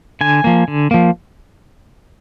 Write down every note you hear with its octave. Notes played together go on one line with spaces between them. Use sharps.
D3 G#5
F3 A#3
D3
F3 A#3